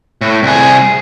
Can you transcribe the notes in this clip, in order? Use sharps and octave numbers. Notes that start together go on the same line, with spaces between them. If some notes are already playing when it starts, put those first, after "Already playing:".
A2
C2 G#4